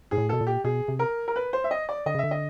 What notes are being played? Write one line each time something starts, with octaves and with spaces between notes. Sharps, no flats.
G#2 G#4
A2
B2 A4
A#2
G4
B2 G#4
C3
A#4
A#4
B4
C5
E5
D#5
D5
D3 D#5
C#3
D3 E5
D#5